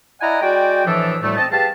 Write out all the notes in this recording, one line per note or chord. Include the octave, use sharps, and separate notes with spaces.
E4 D5 D#5 F#5 G#5 A#5
G#3 F#4 D5 G5
A2 E3 F3 D4 A4 E5
D2 A2 G3 A3
C4 D#5 A5
G4 G#4 B4 F5 A5